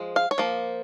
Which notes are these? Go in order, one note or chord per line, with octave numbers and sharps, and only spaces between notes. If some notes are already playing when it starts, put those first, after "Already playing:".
Already playing: F3 G#3
F5
C#5
F3 A#3